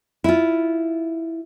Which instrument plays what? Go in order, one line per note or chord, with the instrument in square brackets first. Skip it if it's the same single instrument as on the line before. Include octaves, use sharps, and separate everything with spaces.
[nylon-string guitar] E4 F4